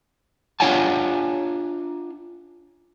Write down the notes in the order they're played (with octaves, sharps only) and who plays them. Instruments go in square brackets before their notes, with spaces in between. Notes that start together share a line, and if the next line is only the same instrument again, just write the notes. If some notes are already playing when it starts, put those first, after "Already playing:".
[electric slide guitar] D4 F4 C#5 F#5 G#5 A5